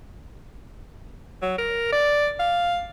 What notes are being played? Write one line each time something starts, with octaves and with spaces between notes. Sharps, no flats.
F#3
A#4
D5
F5